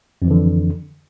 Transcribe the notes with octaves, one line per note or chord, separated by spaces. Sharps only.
F2 D3 E3 F3